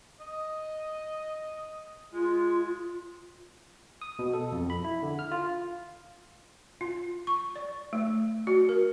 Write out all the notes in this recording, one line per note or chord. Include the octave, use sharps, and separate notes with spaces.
D#5
G#3 F4
D#6
B2
A4
F2
B5
E4
D3
F6
F4
F4
C#6
D5
A3
F#4
A#4